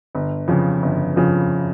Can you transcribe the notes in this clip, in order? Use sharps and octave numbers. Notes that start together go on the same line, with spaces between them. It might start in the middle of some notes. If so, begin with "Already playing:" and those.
G1
F2 C#3 F3
G1
F2 C#3 F3